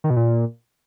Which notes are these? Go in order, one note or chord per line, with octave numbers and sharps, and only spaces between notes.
D#3
B2
A#2